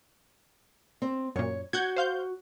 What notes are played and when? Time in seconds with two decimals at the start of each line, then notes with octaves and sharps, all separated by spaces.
1.02 C4
1.36 F#2 A#2 C#5
1.73 F#4 F#5 G6 G#6
1.96 C5 F5 G6